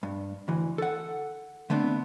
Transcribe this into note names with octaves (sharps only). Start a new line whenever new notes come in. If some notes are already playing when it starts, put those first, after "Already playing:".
G2
D2 E3
A4 F#5
D3 A3 B3 C4 D4